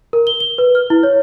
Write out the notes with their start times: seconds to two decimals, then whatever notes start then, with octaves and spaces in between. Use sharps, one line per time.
0.13 A#4
0.27 G7
0.40 G7
0.58 B4
0.75 F6
0.90 E4
1.03 C#5